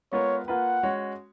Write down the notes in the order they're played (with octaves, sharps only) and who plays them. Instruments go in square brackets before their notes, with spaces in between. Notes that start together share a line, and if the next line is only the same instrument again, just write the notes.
[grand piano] G#3 B3 F4 A#4 [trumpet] C#5
[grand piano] A#3 F4 B4 [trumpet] F#5
[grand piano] G#3 C#4 F#4 C#5